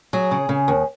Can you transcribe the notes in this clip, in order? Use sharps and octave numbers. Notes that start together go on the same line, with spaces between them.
F#3 G#4
C#3
C#3
D#2